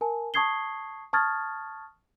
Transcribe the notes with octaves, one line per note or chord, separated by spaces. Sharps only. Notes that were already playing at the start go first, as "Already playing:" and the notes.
A#4 G#5 A5
A5 C#6 D#6 G#6 C7 G7
A5 C#6 D#6 F6 G#6 A6